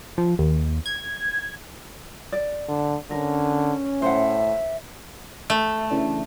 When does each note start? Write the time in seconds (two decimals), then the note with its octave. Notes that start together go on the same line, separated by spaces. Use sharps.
0.18 F3
0.39 D#2
0.86 G#6
2.32 D5
2.68 D3
3.11 D3 C#4 A#4
4.02 A2 C5 E5 F#5
5.50 A3
5.91 C#3 E3 D4